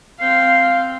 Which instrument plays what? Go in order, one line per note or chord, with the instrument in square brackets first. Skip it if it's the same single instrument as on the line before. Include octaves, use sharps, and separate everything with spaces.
[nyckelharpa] C4 G5 [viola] F5 [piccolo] C7